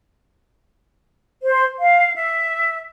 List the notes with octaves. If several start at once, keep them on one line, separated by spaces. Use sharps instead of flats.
C5
F5
E5